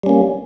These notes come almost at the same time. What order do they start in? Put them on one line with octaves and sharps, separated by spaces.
G3 C#4 A#3